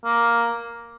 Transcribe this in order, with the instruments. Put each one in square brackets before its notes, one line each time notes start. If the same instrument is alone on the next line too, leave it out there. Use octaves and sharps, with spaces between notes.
[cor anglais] A#3